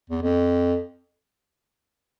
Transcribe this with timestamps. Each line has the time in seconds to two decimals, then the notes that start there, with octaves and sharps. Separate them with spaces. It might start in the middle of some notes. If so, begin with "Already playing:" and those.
0.10 E2
0.22 F2